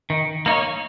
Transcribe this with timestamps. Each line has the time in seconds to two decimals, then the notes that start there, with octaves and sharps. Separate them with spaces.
0.10 D#3
0.46 A#3 D#4 C#5